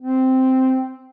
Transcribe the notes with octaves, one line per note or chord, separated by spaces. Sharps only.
C4